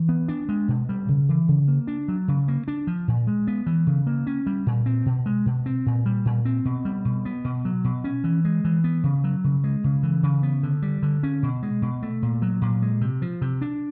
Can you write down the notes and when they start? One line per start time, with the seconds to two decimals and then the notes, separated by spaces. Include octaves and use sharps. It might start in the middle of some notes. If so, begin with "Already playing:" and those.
Already playing: E3
0.09 B3
0.28 D4
0.49 G#3
0.68 B2
0.89 G3
1.09 C#3
1.29 E3
1.48 C#3
1.68 A#3
1.87 D4
2.08 F#3
2.28 C#3
2.48 A#3
2.68 D4
2.87 F3
3.08 A#2
3.27 G#3
3.47 B3
3.66 E3
3.87 C#3
4.07 A#3
4.27 C#4
4.46 G3
4.66 A#2
4.86 C4
5.06 B2
5.26 G#3
5.46 B2
5.66 C4
5.86 A#2
6.06 G3
6.25 A#2
6.45 C4
6.65 B2
6.85 G3
7.05 B2
7.25 B3
7.44 B2
7.65 F#3
7.84 B2
8.04 C#4
8.24 E3
8.45 G#3
8.64 E3
8.84 B3
9.04 C#3
9.24 F#3
9.44 C#3
9.64 G#3
9.84 C#3
10.03 E3
10.23 C#3
10.43 B3
10.63 D3
10.82 G3
11.03 D3
11.23 C#4
11.43 B2
11.63 G#3
11.82 B2
12.03 A3
12.22 A#2
12.42 F#3
12.62 A#2
12.82 G#3
13.01 C3
13.22 F3
13.41 C3
13.61 D4